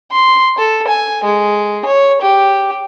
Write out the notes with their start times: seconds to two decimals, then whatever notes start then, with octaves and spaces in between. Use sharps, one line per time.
0.12 C6
0.58 A4
0.87 G#5
1.23 G#3
1.85 C#5
2.21 G4